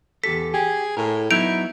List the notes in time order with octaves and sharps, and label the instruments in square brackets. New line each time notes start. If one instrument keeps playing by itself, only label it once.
[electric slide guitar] E2 G4 A4 [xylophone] B6
[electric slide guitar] G4 [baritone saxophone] G#4
[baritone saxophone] A2 [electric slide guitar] A#4
[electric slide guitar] F#3 B3 D#4 [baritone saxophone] E4 [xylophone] G6 D7 F7